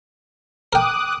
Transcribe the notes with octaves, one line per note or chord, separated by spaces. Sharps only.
A#4 G5 D6 D#6 F#6